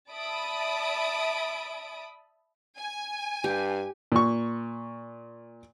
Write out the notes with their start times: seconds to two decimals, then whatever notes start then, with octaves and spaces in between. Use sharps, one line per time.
0.11 D5 E5 A5 B5 D#6 D7
2.78 G#5
3.44 G2 G4
4.12 A#2 C#6